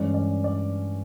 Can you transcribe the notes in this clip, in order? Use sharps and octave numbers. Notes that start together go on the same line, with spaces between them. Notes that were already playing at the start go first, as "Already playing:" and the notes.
Already playing: G2 E3 G#3 C#4 D5
D5
D5